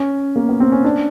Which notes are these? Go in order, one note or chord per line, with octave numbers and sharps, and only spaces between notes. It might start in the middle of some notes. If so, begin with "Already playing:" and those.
Already playing: C#4
A#3
B3
C4
C#4
D4